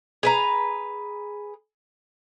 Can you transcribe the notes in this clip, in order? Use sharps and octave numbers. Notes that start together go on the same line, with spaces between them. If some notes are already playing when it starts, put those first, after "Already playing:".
G#4 B4 A#5